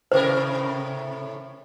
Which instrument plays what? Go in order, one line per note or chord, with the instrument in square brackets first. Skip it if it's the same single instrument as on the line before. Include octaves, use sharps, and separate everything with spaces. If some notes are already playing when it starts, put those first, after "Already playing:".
[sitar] A2 C3 A#4 [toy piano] C5